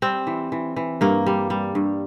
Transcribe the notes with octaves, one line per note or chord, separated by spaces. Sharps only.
G3 C4
E3
E3
E3
G2 A#3
G3
G3
G2